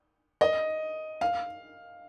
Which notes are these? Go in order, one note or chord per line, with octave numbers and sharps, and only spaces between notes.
D#5
F5